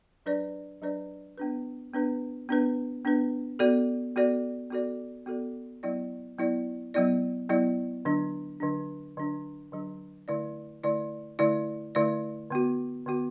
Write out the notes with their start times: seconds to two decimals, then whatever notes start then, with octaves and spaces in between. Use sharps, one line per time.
0.26 F#3 D4 B4 D5
0.82 F#3 D4 B4 D5
1.38 B3 D4 B4
1.93 B3 D4 B4
2.49 B3 D4 B4
3.05 B3 D4 B4
3.59 B3 F#4 A4 D5
4.16 B3 F#4 A4 D5
4.71 B3 F#4 A4 D5
5.26 B3 F#4 A4 D5
5.83 F#3 B3 E4 D5
6.38 F#3 B3 E4 D5
6.94 F#3 B3 E4 D5
7.49 F#3 B3 E4 D5
8.05 D3 F#3 D4
8.60 D3 F#3 D4
9.17 D3 F#3 D4
9.72 D3 F#3 D4
10.28 D3 A3 E4 D5
10.83 D3 A3 E4 D5
11.39 D3 A3 E4 D5
11.95 D3 A3 E4 D5
12.51 D3 B3 F#4
13.06 D3 B3 F#4